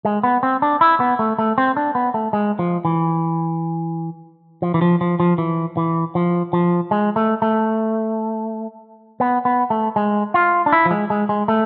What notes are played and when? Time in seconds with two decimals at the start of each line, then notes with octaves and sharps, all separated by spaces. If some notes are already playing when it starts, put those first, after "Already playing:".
0.05 G#3
0.23 B3
0.43 C4
0.62 D4
0.81 E4
1.00 B3
1.19 A3
1.39 A3
1.58 C4
1.77 D4
1.95 B3
2.14 A3
2.33 G#3
2.59 F3
2.85 E3
4.62 F3
4.74 E3
4.81 F3
5.01 F3
5.20 F3
5.38 E3
5.77 E3
6.15 F3
6.53 F3
6.91 G#3
7.16 A3
7.42 A3
9.20 B3
9.45 B3
9.70 A3
9.96 G#3
10.34 F4
10.66 D4
10.72 E4
10.86 F3
10.91 G#3
11.10 G#3
11.29 G#3
11.48 A3